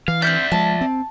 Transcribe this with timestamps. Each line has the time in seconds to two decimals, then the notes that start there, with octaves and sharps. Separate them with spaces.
0.08 E3 F5
0.22 C4 D5 E5 F6 G6
0.52 F3 G#3 A5
0.81 C4